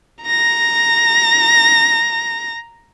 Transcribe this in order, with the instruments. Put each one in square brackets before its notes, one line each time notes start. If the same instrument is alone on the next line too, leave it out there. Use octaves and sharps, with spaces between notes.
[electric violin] A#5 A#6